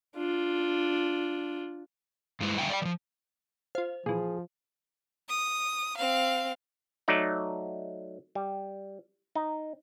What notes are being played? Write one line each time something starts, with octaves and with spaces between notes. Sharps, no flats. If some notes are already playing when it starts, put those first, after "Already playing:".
D4 F4
G2 G#3 E4 B4 C5
F#2 D3 G3 E5 G5 G#5
D5 F5 G5
E3 F3
F4 C5 F5
A#2 E3 F3 G#4
D#6
C4 F5
F#3 A3 D#4 D5
G3
D#4